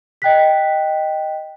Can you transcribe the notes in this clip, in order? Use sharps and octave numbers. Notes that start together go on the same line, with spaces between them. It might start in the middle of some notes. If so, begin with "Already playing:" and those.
D#5 G5 F#6 B6